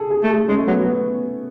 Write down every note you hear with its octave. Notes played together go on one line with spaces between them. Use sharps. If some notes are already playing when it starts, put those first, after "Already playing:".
Already playing: G#4 A4
G#4
A3
G#4
G#3 C#4
A3
F#3 B3
B3